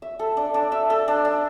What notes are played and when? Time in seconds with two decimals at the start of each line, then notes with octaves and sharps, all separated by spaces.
0.02 E5
0.19 A4
0.37 D4
0.54 D4
0.72 E5
0.90 A4
1.08 D4
1.25 D4